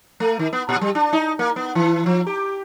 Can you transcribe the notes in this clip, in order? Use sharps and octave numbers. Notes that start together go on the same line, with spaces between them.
A3
D#3
B3
A#2
G3
D4
D#4
A#3
B3
E3
F3
G4